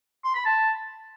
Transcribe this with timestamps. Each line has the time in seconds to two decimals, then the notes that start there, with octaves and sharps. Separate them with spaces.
0.24 C6
0.35 B5
0.45 A5